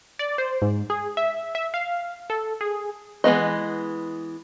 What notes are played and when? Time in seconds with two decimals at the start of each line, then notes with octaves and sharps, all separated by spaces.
0.19 D5
0.38 C5
0.62 G#2
0.90 G#4
1.17 E5
1.55 E5
1.74 F5
2.30 A4
2.61 G#4
3.24 E3 G#3 B3 D#5